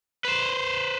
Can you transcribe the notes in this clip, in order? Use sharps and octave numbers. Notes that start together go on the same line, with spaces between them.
B4 C5